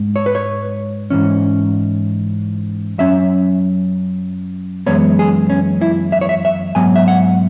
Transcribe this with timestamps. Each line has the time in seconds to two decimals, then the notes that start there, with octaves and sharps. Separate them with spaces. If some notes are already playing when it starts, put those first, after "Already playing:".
Already playing: G#2 G#3
0.16 C#5
0.26 B4
0.35 C#5
1.10 G#2 E3 C#4
2.98 F#2 F#3 C#4 E5
4.86 F#2 E3 G#3 B3 C#5
5.19 G#4
5.50 C#4
5.82 E4
6.12 E5
6.21 C#5
6.29 E5
6.45 E5
6.75 G#2 F#3 B3 G#5
6.96 E5
7.08 F#5